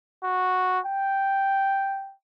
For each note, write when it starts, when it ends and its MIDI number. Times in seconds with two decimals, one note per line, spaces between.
0.23 0.79 66
0.86 2.14 79